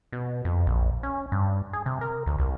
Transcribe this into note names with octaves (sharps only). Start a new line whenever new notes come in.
B2
F2
A#1
C#4
G2
G#4
C3
A#4
D2
C2